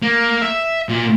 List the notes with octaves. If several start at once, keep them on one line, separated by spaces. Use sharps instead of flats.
A#3
E5
A#2